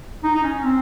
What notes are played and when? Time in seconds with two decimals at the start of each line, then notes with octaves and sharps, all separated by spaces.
0.24 D#4
0.35 D#4
0.44 C#4
0.64 C4